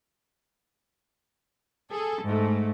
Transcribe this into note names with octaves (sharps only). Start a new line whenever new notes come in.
G#4 A4
G#2 A3